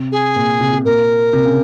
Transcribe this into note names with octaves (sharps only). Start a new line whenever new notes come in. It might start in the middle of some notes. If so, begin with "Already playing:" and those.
Already playing: C3
G#4
A#2
C3
C3
A#2 A#4
C3
C#3